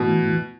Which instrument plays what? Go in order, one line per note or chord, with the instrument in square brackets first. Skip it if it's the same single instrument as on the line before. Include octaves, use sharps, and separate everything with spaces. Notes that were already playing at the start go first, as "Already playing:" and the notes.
Already playing: [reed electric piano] G#2 E3 A3 E4 [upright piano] B2